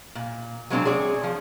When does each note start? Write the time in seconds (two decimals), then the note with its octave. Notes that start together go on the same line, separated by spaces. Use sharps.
0.15 A#2
0.70 F#3 G#3 A#3 C4 D4
0.85 G#4 C#5 D5
1.23 F3